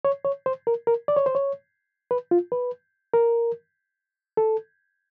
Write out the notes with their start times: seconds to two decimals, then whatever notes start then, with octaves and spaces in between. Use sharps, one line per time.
0.05 C#5
0.25 C#5
0.46 C5
0.67 A#4
0.87 A#4
1.08 D5
1.16 C#5
1.26 C5
1.35 C#5
2.11 B4
2.31 F4
2.52 B4
3.14 A#4
4.37 A4